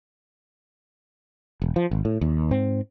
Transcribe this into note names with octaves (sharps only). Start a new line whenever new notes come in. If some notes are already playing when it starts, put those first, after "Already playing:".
E1
F3
G#1
A2
D#2
G#2 C4